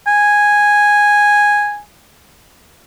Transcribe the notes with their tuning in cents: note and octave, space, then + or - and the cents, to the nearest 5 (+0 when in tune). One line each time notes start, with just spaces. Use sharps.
G#5 -5